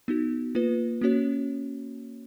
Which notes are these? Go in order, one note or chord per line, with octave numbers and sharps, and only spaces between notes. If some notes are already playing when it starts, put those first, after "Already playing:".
B3 D#4 F#4
A#3 F4 B4
A#3 C#4 F#4 C#5